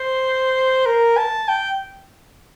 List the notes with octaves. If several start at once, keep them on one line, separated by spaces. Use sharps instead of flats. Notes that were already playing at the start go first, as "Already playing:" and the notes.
Already playing: C5
A#4
A5
G5